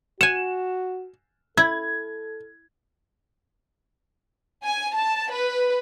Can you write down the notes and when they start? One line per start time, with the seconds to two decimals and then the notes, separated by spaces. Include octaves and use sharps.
0.21 F#4 F#5 G#5 E7
1.57 E4 A4 G#6
4.64 G#5
4.95 A5
5.31 B4